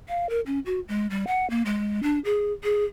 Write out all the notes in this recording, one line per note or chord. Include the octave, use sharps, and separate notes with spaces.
F5
A#4
C#4
F#4
G#3
G3
F#5
A#3
G#3
D4
G#4
G#4